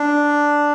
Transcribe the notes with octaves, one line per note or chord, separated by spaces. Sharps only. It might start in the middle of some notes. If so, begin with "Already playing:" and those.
Already playing: D4